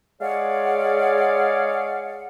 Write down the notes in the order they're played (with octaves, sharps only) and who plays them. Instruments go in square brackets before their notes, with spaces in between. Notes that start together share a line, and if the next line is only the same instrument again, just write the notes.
[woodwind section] G#3 G#4 C#5 D5 F5 F#5